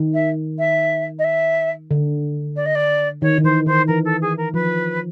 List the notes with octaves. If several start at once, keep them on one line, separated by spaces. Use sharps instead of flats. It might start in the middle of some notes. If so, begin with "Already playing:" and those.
Already playing: D#3
E5
E5
D#5
E5
D3
D5
D#5
D5
D#3 C#5
D#3
E3 C5
D#3 C5
E3 A#4
A4
G#4
A#4
F3 B4